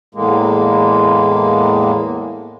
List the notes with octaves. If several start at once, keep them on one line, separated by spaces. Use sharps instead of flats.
E2 A2 G#3 A#3